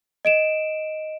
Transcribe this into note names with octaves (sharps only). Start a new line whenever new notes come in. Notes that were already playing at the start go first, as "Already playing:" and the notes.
D#5 D7 E7